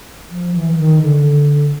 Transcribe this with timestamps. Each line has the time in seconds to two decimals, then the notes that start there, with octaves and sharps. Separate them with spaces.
0.31 F3
0.55 E3
0.73 E3
0.78 D#3
1.02 D3